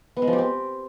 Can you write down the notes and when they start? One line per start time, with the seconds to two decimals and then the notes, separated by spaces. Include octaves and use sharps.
0.17 B3
0.22 G#3
0.27 F3
0.33 G4
0.38 C4